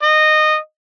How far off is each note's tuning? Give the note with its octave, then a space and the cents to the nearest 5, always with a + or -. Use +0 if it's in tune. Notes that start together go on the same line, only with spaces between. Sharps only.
D#5 -15